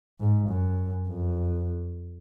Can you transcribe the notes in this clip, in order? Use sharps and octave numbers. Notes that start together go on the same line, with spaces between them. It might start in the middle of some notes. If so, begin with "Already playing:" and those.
G#2
F#2
F2